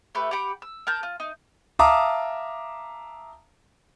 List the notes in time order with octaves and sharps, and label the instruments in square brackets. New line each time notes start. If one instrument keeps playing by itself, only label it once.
[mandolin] A3 G4 B4
G4 F#5 B5 D6
E6
A#4 A5 G6
F4
D#4
[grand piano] E5 F5 A5 A#5 D6 D#6